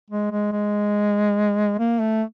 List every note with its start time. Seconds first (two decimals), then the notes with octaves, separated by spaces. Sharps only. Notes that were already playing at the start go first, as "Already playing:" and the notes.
0.10 G#3
0.32 G#3
0.52 G#3
1.79 A#3
2.00 A3